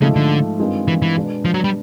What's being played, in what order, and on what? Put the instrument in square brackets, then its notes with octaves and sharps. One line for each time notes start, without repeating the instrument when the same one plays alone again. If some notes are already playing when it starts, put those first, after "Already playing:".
[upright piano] G#2 F3 A3 [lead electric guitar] C#3
[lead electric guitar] D3
[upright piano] G2 D#3 G#3 C4 F4
[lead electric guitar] E3
E3
[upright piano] B2 G#3 B3 D4
[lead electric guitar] F3
F#3
G3